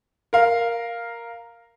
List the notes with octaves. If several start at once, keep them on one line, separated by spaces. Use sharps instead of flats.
A#4 F5